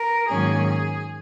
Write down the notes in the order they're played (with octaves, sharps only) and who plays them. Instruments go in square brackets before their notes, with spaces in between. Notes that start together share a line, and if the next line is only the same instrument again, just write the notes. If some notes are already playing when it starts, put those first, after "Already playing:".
Already playing: [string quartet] A#4
G#2 D#3 F#3 A#3 C#4 G#4